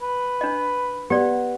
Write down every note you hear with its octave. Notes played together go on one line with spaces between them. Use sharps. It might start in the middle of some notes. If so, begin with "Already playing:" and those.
B4
D4 D#5
B3 G4 D5